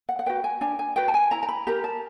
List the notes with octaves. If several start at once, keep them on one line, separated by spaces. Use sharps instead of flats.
F#5
F#5
F#4 B4 G5
G#5
D4 G#5
G#5
F#4 B4 G5
A5
G#5
E4 A#5
A#5
B5
G4 A#4 A#5
A5